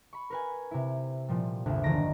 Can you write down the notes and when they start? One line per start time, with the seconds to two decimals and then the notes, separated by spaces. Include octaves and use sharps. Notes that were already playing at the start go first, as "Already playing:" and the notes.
0.13 B5 C#6
0.30 A#4 B4 G#5
0.71 C3 E4
1.28 A#2 F3 G3
1.66 G1 D2 C3
1.83 E1 D3 D#3 A#5 A#6 D7